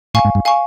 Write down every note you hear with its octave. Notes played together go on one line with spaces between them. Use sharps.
A2 F5 G#5 C#6
G#2
G2
F5 G#5 C#6